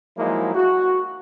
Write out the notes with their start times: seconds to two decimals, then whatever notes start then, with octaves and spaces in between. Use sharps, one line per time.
0.17 F3 F#3 G#3 A#3 D#4 E4
0.55 F#4